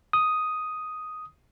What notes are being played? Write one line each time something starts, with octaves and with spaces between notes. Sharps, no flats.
D#6